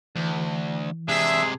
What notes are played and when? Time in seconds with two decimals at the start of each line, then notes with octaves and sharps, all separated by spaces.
0.16 D2 E3
1.09 C3 G#3 D4 G#4 E5